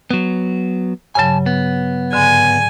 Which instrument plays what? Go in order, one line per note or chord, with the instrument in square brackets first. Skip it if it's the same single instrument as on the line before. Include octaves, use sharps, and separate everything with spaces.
[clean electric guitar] F#3 B3
[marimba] G2 C#3 F#3 [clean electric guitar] G#5 A5
[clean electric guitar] B3
[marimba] G#2 D3 [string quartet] G#5